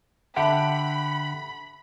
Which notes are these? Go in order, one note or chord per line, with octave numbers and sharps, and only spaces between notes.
D3 G4 E5 F#5 A5 B5